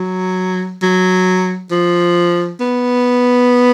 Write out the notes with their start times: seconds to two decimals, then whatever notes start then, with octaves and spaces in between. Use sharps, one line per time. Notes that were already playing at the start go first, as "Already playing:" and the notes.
Already playing: F#3
0.82 F#3
1.71 F3
2.60 B3